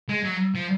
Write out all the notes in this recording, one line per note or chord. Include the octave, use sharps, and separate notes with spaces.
G#3
F#3
F3